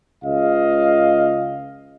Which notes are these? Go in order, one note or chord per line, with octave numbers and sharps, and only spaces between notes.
C#2 D#5 F5